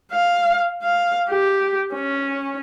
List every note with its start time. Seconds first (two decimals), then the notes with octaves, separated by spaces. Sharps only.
0.12 F5
0.83 F5
1.30 G4
1.94 C#4